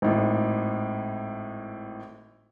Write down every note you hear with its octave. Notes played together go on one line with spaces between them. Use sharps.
G#1 A2